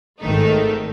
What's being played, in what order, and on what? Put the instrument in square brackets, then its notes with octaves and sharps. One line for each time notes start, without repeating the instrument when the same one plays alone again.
[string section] G#1 D#3 A3 D#4